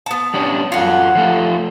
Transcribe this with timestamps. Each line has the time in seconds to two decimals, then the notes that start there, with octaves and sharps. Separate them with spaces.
0.06 B3 A5
0.34 G3 C#4 D4
0.72 F#2 F4 C#5 F#5
1.15 F3 A3 F4